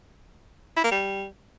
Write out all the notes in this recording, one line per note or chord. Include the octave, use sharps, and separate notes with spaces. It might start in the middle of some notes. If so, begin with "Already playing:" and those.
E4
A#3
G3